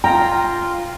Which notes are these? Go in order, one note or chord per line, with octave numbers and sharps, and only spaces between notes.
F4 G5 A#5